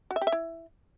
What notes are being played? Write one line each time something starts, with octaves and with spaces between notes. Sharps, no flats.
F#4
E5
G4
E5
E4